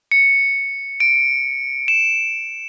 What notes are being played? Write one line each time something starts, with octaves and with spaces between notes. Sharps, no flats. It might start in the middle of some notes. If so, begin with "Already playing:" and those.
C#7
D7
E7